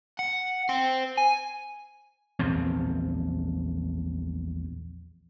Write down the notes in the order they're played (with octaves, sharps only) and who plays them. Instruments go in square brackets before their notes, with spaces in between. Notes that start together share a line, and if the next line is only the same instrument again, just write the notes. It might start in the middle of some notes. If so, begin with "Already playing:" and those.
[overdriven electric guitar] F#5
C5 G5
G#5
[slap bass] A#1 E2 F3 C4